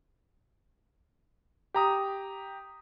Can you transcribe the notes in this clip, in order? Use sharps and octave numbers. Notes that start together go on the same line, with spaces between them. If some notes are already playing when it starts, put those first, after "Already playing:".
G4 A#5 D#6